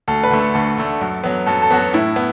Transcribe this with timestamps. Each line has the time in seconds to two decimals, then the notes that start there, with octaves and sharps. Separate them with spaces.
0.08 D2 A4
0.24 B4
0.31 D3 A3
0.39 A4
0.54 D2 A4
0.78 D3 A3
1.01 F#2
1.24 F#3 B3
1.46 F#2 A4
1.62 A4
1.70 F#3 B3 F#4
1.78 A4
1.93 A2 E4
2.16 B3